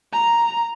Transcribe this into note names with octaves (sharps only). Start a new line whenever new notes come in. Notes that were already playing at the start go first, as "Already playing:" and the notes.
A#5